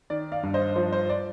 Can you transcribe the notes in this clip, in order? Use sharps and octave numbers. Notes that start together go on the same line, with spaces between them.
D#3 D5
D5 F5
G2
C5 D#5
F3 C5
C5
D5